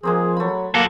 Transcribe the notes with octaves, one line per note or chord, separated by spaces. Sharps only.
F3 G#3 A#3 C4 G#4
F#3 A3 B5
F#3 A#3 F#4 A4